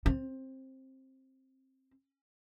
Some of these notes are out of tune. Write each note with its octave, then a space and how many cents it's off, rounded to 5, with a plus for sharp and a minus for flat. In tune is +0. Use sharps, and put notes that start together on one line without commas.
C4 +15